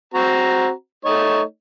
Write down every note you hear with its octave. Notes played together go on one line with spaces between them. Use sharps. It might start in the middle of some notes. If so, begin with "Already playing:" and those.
C4 F#4 A#5
A3 D#4 C#5